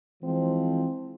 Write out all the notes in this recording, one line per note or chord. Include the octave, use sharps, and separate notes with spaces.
E3 F3 G#3 C4